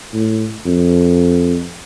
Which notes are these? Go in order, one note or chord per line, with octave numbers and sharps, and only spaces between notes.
A2
F2